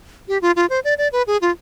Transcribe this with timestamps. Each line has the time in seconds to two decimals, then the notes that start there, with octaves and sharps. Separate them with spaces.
0.28 G4
0.42 F4
0.56 F4
0.70 C5
0.84 D5
0.98 D5
1.12 B4
1.27 G#4
1.42 F4